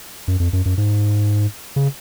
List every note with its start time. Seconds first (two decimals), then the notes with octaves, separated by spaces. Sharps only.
0.28 F#2
0.40 F2
0.53 F#2
0.66 F#2
0.78 G#2
1.76 C#3